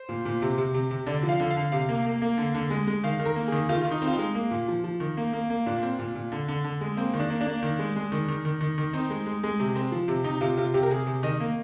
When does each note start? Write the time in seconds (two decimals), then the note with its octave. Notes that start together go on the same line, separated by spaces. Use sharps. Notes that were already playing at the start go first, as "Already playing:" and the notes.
Already playing: C5
0.09 A#2
0.25 A#2
0.42 C3
0.58 C3
0.74 C3
0.91 C3
1.06 D3 D5
1.23 F3
1.29 F5
1.40 D3
1.51 F5
1.56 D3
1.72 C3 F5
1.89 A#3
2.06 A#3
2.22 A#3
2.38 D3
2.55 D3
2.70 G#3
2.87 G#3
3.03 D#3 F5
3.19 D#3
3.25 A#4
3.36 A#3
3.48 D#3 G#4
3.69 D#3 F4
3.81 D#3 F4
3.91 D#4
4.02 C4
4.07 F4
4.13 D#4
4.18 G#3
4.35 A#3
4.51 A#2
4.68 F3
4.84 F3
5.00 D#3
5.17 A#3
5.33 A#3
5.50 A#3
5.66 A#2 D4
5.82 C4
5.99 A#2
6.15 A#2
6.32 D3
6.48 D3
6.64 D3
6.81 G#3
6.97 A#3 C4
7.13 D#3
7.19 D4
7.30 A#3
7.41 D4
7.47 A#3
7.63 D#3
7.79 G#3
7.96 G#3
8.12 D#3
8.28 D#3
8.45 D#3
8.61 D#3
8.78 D#3
8.93 C4 D#4
9.10 G#3
9.26 G#3
9.43 G#3
9.60 C3
9.75 C4
9.92 F3
10.08 C3
10.24 C3 D#4
10.41 C3 F4
10.58 C3 F4
10.74 C3 G4
10.83 A#4
10.90 C3 G#4
11.07 C3
11.23 D#3 D#5
11.40 A#3